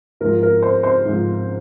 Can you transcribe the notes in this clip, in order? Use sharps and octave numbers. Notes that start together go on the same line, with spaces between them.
G#2 F3 A#4
A#4
C5
C5
G#2 F3